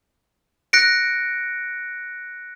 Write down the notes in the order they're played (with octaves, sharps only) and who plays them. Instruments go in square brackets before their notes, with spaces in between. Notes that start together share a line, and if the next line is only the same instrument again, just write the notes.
[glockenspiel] F#6 A#6 C#7 D7